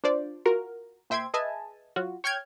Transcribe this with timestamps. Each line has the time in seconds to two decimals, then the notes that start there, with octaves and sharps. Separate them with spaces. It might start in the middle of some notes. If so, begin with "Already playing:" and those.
0.04 D4 F4 C5 D5
0.45 F4 F#4 A#4
1.10 A#2 C5 E5 G5 C6 G#6
1.34 G#4 B4 D#5 E5 G#5 A5
1.96 F#3 F4 F#4
2.24 C#5 G5 F6 G6 G#6